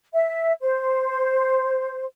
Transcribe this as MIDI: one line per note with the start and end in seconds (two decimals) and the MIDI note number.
0.13 0.52 76
0.61 2.04 72